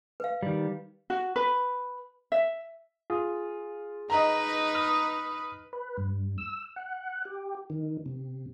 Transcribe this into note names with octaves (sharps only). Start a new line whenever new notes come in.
B4 F5
D#3 G3
F#4
B4
E5
F4 G#4
D#4 B4 D#5 A#5
B5 D#6 F6
B4
G2
E6
F#5
G4
D#3
C3